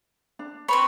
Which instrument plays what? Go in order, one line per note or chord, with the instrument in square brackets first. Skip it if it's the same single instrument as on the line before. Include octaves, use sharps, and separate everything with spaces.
[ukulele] D4
[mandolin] C4 B4 C#5 [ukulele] B5